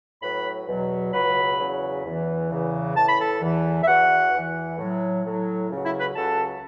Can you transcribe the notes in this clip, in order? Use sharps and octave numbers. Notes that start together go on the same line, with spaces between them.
A2 F#3 B4 B5
E2 B2 F#3
C#2 C#3 F#3 B4 B5
E2 C#3 F#3
E2 E3
E2 C#3 E3
A2 E3 A5
B5
A4 A5
E2 E3
E5
E2 E3 F#4 F#5
E2 E3
A2 F#3
A2 F#3
C#2 C#3 F#3
E4 E5
B4 B5
C#2 C#3 F#3 A4 A5